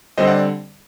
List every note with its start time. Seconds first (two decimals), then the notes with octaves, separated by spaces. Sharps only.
0.17 D3 G3 C4 C5 D#5
0.27 D5 F#5